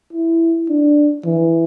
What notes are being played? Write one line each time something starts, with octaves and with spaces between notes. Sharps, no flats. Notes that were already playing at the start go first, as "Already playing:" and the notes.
E4
D4
E3